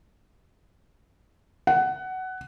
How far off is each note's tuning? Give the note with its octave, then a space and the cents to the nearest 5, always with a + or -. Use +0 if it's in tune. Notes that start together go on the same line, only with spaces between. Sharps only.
F#5 +15